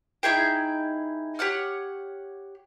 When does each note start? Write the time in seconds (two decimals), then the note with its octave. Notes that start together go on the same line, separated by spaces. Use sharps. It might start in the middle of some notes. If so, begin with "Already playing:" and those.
0.23 D#4 E4 G#4 G5
1.39 G4 C#5 F#5 F6